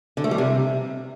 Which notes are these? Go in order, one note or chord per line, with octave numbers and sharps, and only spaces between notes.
D3
A3
G3
C3